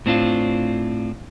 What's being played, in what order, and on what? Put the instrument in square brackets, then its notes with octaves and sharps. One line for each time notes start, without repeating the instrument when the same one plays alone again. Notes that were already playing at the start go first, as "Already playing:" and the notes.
[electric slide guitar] A2 C4 D4 F4